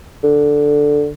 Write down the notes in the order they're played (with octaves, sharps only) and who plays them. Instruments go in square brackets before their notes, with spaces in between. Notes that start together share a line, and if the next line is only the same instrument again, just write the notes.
[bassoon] D3